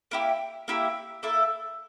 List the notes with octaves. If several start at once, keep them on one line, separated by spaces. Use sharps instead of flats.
A#3 E4 G4
A#3 E4 G4
A#3 E4 A4